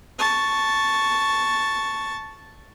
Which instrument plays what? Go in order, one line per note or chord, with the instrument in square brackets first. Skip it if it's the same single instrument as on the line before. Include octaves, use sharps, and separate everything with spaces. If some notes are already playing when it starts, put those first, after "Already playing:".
[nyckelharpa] A5 C#6